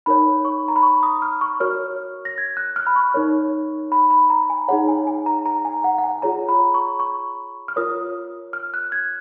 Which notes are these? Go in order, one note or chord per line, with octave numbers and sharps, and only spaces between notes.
D#4 A#4 C#5 B5
C#6
A#5
B5
C#6
D#6
F6
C#6
F#4 A#4 C#5 F6
A#6
G#6
F#6
F6
B5
C#6
D#4 A#4 C#5
B5
B5
A#5
G#5
D#4 G#4 C#5 F#5
G#5
G#5
A#5
A#5
G#5
F#5
F#5
G#5
F4 G#4 C#5 A#5
B5
C#6
C#6
F6
F4 A#4 C#5 D#6
F6
F#6
G#6